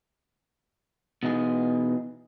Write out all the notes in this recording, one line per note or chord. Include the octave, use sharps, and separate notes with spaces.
B2 E3 D#4 G#4